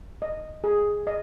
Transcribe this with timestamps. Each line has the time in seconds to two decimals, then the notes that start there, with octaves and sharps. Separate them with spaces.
0.22 D#5
0.64 G#4
1.07 D#5